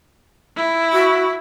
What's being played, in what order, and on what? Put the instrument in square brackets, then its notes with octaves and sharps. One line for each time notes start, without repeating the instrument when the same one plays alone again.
[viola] E4
[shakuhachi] F#4